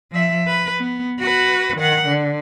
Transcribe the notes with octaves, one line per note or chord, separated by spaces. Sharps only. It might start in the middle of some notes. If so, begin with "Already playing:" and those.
F3 E5
B4
B3
F#4 B4
D#3 F#5
D3